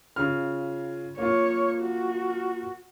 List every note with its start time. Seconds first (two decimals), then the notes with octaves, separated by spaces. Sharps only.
0.16 C#3 F4 F6
1.18 A#3 F4 C#5
1.82 F#4